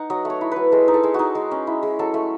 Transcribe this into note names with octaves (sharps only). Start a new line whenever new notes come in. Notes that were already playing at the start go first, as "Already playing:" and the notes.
Already playing: D#4 F#5
F#3 D#5
A3 C#5
E4
F#3 B4
G#3 A4
D#4
A4
G#3
D#4 F#4
G#3
C#4
E4
G#3
F#3 A4
A3